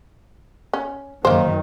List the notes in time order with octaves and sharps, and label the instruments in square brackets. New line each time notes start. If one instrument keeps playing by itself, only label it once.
[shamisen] C#4
[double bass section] F#2 D#3 [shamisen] A#3 C5